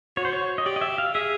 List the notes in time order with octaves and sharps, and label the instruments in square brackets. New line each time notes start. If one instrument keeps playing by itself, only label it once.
[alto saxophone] F#4 [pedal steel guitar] C#5
[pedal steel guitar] C5
C#5
D#5
[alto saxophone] G4 [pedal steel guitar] D5
[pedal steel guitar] D#5
E5
F5
[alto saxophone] G#4 [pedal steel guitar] E5